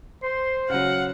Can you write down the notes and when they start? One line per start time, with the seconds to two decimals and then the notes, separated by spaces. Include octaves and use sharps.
0.23 C5 C6
0.70 C#3 F#3 F5 F#5